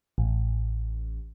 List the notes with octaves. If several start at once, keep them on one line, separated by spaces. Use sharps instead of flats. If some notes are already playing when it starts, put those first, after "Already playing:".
A1